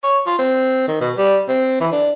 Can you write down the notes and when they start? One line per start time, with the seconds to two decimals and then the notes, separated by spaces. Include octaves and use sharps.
0.04 C#5
0.27 F4
0.39 C4
0.88 D#3
1.01 B2
1.17 G3
1.49 C4
1.81 E3
1.92 D4